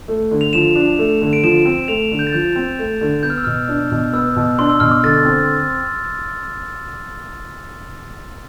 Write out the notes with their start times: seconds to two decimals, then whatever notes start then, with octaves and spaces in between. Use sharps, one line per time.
0.08 A3
0.31 D3
0.41 F7
0.53 F3 E7
0.75 D4
0.99 A3
1.22 D3
1.33 D7
1.43 F3 E7
1.65 C4
1.88 A3 F7
2.12 D3
2.19 G6
2.27 A6
2.33 F3 G6
2.56 C4
2.79 A3
3.01 D3
3.23 B3 G6
3.30 F6
3.38 E6
3.44 B2 F6
3.68 D4
3.91 B2
4.13 B3 E6
4.36 B2
4.58 D4 C6
4.69 E6
4.80 B2 F6
4.91 D6
5.03 D3 A6
5.25 C4